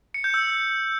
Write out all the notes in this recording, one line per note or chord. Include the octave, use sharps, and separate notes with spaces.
C#7
G6
E6